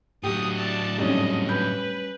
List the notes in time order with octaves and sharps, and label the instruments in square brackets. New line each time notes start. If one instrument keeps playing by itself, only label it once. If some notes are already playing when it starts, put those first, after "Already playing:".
[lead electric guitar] A2 F#3 [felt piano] G4 G5 [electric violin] D#6
[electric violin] D5 A5
[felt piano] F2 G#2 [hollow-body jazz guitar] G3 C#4 [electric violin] D#5
[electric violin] B4 [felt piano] B5 G6